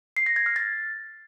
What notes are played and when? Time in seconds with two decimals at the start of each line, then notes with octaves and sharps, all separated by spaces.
0.17 C7
0.26 A#6
0.36 G#6
0.46 F6
0.56 A6